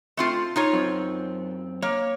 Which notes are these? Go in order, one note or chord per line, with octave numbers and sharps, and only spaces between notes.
A3 C4 F4
D#4 F4 C#5
F#2 C4
A#3 C#5